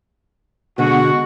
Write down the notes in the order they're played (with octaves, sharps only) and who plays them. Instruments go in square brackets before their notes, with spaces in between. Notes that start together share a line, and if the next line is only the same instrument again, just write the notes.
[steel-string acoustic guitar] B2 D3 G#3 [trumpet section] F#4